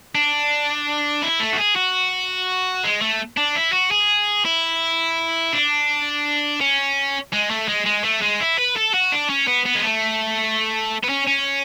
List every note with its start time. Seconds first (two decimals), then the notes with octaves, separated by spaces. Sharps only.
0.15 D4
1.23 E4
1.40 A3
1.53 F#4
1.59 G#4
1.76 F#4
2.84 G#3
3.01 A3
3.37 D4
3.56 E4
3.73 F#4
3.91 G#4
4.45 E4
5.53 D4
6.61 C#4
7.33 G#3
7.50 A3
7.68 G#3
7.86 G#3
8.05 A3
8.22 G#3
8.40 E4
8.58 B4
8.76 A4
8.94 F#4
9.12 D4
9.30 C#4
9.47 B3
9.66 B3
9.76 G#3
9.84 A3
11.04 B3
11.10 C#4
11.28 C#4